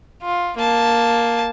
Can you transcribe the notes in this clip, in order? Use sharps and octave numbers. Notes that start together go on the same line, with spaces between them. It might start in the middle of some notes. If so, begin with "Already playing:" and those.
F4
A#3 A5